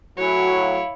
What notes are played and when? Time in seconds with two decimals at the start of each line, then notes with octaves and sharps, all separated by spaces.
0.18 A2 F#3 E4 F#4 C#5 G#5
0.60 F5